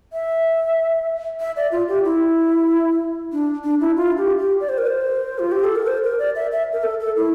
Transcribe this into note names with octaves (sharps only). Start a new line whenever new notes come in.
E5
E5
D5
F4
G4
E4
D4
D4
E4
F4
G4
G4
D5
C5
A#4
C5
F4
G4
A4
A#4
C5
A#4
D5
E5
E5
A#4
A4
A4
E4